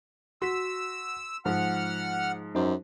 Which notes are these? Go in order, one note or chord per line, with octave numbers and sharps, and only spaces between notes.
F#4 C6 E6 B6
G#2 F3 F#5 F6
F#2 D#4 C5